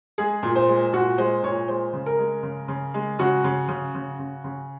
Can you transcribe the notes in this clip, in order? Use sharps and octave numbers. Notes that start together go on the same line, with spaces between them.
G#3 G#4
A#2
C5
G#3
A#2 F#4
G#3 C5
A#2 C#5
G#3 C5
C#3
A#4
G#3
C#3
C#3
G#3
C#3 F#4
C#3
C#3
C#3
C#3
C#3